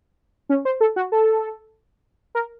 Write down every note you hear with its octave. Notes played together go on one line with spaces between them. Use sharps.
C#4
C5
A4
F#4
A4
A#4